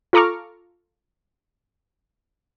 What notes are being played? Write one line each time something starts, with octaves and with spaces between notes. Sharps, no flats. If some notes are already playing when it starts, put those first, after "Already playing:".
F4 A4 A#5 C#6 D6 F6